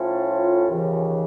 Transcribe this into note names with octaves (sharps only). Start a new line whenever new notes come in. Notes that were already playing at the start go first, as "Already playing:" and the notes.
Already playing: A2 F3 A3 C#4 F4
D#2 C#3 E3